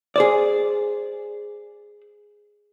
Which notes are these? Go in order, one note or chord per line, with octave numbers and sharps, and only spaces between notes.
G#4 C5 D5